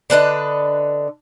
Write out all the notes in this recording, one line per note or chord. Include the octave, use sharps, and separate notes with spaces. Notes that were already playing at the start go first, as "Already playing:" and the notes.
D3 D4 B4 D#5